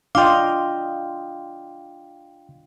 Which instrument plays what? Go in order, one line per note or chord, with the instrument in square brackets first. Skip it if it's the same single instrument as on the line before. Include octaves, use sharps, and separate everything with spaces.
[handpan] D4 F4 D#5 [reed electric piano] F5 G5 [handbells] C6 D6